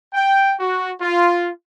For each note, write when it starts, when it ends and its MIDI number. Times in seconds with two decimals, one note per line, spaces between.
0.13 0.53 79
0.59 0.90 66
1.00 1.49 65